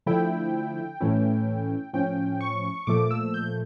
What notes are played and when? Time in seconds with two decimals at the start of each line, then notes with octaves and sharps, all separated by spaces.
0.06 D3 F3 A3 E4 G5
1.01 A2 E3 A3 C#4 E4
1.93 A2 F3 C#4 G5
2.41 C#6
2.87 A#2 F3 A3 D6
3.11 E6
3.34 G6